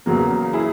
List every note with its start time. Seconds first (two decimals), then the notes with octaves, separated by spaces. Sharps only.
0.06 E2 C#3 F#3 A#3
0.53 E4 G#4